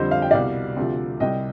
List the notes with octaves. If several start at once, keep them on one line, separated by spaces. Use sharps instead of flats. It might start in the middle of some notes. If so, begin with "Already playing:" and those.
Already playing: F2 D3 G3 C5 D#5
F5
G5
C2 B2 G3 D5 F5
D2 C3 F3
C2 C3 G3 D#5 G5